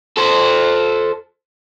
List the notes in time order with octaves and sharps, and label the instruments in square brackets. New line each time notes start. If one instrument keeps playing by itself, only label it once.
[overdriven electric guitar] A4 C5